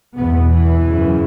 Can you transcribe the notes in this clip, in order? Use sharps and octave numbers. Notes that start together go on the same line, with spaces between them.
E2 B2 B3
E3
F#2 C#3